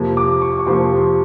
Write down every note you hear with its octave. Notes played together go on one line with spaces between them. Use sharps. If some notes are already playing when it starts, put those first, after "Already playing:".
Already playing: F2 C3 F3 A#3
D6
C#6
C#6
F2 C3 F3 A#3 C6